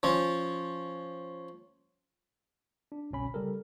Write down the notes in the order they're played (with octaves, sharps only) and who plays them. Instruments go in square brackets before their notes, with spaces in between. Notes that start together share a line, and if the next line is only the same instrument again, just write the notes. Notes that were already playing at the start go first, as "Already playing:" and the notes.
[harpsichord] F3 C#4
[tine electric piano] D4
G1 C2 B2 C#4 B5
C#3 G3 G4 A4 A#4